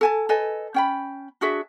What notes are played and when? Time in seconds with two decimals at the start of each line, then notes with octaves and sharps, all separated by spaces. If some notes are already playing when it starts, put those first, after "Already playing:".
0.01 A4 G#5 A5
0.29 A4 B4 D#5 G#5
0.74 C#4 G5 B5
1.41 D4 F#4 G#4 E5